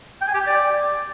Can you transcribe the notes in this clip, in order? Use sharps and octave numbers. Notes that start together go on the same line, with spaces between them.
G5
G#5
G4
G5
D5